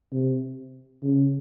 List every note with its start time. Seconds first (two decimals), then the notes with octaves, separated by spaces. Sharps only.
0.13 C3
1.03 C#3